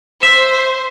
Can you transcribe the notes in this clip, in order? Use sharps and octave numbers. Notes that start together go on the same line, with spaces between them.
C5 E5